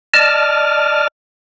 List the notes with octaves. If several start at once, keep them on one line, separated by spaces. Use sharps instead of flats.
D5 D#5 A5 F6